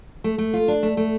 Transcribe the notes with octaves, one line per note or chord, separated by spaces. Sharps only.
A3
A3
F4
D4
A3
A3